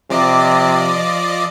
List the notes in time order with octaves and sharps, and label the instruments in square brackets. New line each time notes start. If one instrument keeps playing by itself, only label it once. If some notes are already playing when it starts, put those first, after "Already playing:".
[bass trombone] C3 [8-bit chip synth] F3 D5 D#5